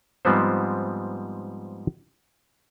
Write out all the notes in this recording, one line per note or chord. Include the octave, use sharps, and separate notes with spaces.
G#2 F3 G3 B3 C4 C5